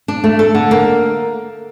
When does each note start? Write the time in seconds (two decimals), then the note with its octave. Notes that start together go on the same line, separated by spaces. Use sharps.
0.08 D4
0.24 A3
0.39 A4
0.55 D3
0.71 A#3